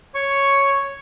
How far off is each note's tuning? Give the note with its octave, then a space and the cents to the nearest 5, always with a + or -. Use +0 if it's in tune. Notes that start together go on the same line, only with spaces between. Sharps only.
C#5 +0 C#6 +0